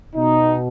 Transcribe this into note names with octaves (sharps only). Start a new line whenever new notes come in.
B2 D#4